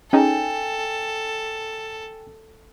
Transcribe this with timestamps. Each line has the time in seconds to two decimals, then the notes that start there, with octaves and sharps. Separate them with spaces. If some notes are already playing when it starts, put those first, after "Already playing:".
0.13 C#4 D#4 G#4 A4 G5 G#5